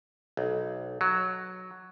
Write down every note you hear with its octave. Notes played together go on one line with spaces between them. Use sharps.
B1
F#3